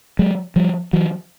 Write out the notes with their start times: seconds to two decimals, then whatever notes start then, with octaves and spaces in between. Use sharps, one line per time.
0.19 F#3 G#3
0.56 F3 G3
0.93 E3 F#3